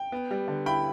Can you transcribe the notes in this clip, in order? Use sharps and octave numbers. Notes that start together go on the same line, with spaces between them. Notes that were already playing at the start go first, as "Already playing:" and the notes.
Already playing: G5
B3
G3
D3
E4 G5 B5